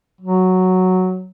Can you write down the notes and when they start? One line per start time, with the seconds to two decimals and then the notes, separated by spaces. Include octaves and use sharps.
0.21 F#3